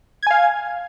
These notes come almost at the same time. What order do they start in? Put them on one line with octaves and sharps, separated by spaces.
G#6 G#5 F5